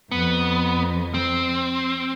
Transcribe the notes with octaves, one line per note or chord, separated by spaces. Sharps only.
F2 B3
C4